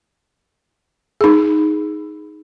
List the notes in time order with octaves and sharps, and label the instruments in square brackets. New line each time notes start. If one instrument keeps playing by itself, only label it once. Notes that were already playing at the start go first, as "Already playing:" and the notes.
[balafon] D#4 G#4